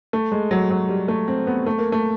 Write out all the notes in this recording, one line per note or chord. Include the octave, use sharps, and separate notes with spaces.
A3
G#3
F#3
F#3
G3
A3
C4
B3
A3
A#3
A3